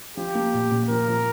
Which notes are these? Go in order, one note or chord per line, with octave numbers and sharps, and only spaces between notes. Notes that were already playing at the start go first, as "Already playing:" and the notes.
F3 G4
A#3
A#2
A#2
F3 A#4
F3